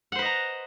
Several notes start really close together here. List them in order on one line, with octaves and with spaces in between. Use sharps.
F#5 C5 B4 D#5 A#5